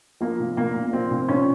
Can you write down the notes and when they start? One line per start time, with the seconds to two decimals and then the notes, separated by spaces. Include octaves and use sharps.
0.20 F3 A#3
0.39 A#2
0.57 A#2 A#3
0.75 A#2
0.92 F3 C4
1.11 A#2
1.28 A#2 C#4